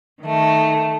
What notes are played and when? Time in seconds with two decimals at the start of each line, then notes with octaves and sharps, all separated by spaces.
0.22 D#3 A3